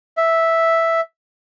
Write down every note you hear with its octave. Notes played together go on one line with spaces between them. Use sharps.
E5